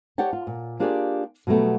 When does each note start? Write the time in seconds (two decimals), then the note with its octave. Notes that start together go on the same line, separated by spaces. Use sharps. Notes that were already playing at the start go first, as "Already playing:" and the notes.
0.18 G4 C#5 D5 F#5 G5 A5
0.33 F4
0.47 A#2
0.80 A#3 D4 F4 G4 G#4 D5
1.47 B2 F#3 G3 A3 B3